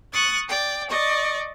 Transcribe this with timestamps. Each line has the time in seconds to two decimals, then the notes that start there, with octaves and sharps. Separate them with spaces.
0.12 C#6 D#6 F#6 A6
0.48 D5 G5
0.88 D5 D#5 C#6